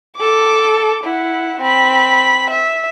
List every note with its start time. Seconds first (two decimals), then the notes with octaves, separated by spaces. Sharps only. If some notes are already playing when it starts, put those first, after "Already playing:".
0.17 A4 D6
1.04 E4 F#5
1.61 C4 B5
2.51 E5